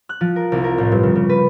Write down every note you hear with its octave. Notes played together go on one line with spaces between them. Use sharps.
F#6
F3
A#4
C2
A#4
A1
G2
C#3
C#3
B4